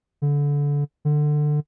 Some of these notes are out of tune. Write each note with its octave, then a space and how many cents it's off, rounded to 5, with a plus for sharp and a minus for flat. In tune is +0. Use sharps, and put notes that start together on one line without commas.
D3 -25
D3 +20